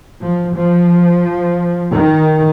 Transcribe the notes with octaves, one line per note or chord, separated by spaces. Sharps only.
F3
F3
D#3